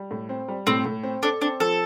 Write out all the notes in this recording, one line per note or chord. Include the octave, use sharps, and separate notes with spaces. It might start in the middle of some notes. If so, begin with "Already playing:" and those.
Already playing: G3
A2
C4
G3
A2 C4
A2
C4
D4 A4
C4 D4
F3 A4